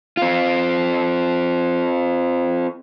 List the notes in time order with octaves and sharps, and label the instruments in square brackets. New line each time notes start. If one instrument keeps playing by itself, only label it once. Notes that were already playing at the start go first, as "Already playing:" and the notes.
[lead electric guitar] C4 F4